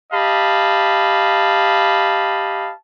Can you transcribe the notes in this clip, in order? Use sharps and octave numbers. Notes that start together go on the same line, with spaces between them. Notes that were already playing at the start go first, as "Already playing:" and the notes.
G4 D#5 F5 A5 B5